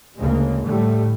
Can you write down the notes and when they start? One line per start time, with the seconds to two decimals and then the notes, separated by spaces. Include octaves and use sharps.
0.19 D2 C#3 G#3 A#3
0.65 A2 D3 G3 A3